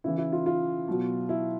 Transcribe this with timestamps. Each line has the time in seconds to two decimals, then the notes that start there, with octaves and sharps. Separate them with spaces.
0.04 C#3 E3 E4
0.18 E4
0.32 F4
0.46 F4
0.88 B2 F#3
1.29 E4